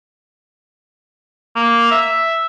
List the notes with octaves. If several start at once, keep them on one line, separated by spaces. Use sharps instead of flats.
A#3
E5